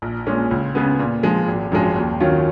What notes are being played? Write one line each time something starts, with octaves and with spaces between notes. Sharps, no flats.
A#1
A#2 G#3 C#4
C#2
C#3 G#3 B3
A#2
F3 G#3
G#1
F#2 F3 G#3
D#2
D#3 F#3 C#4 F4